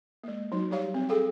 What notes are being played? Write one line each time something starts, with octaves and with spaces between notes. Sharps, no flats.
G#3 A#3
F#3 D#4 F#4
G3 G4 C#5 F5
C4
G#4 A4 F5 G5